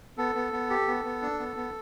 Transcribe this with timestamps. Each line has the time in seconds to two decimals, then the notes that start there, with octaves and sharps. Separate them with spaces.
0.18 B3 A4
0.35 B3
0.53 B3
0.70 G4
0.88 B3
1.05 B3
1.22 D4
1.39 B3
1.57 B3